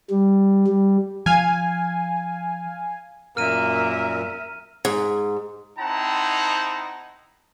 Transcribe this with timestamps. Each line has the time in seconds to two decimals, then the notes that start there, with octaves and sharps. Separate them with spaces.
0.10 G3
0.67 G3
1.26 F3 F5 G#5
3.37 F#2 A#2 A#3 A#4 E5 F6 D#7
4.85 G#2
5.79 C4 D#4 E4 F#5 A5 A#5